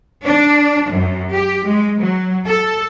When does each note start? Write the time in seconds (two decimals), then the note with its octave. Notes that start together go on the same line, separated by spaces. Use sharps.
0.23 D4
0.88 F#2
1.33 G4
1.67 G#3
2.01 F#3
2.46 A4